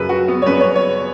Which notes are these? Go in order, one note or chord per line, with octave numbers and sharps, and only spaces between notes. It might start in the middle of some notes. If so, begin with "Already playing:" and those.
Already playing: F#2 C#3 F#3 B4
F#4
B3
C#5
F#2 C#3 F#3 B4
C#5
C#5